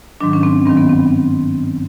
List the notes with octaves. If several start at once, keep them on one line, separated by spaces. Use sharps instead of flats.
G#2 D#3 F#3 D4
C#4
C4
G2 D#3 F#3 C4
B3
C4